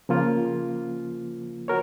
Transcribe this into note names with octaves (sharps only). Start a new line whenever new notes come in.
C#3 F3 A#3 F4
F#4 A#4 C#5